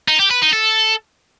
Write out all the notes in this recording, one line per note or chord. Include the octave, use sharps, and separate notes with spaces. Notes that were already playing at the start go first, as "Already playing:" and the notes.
D#4
G4
B4
D#4
A4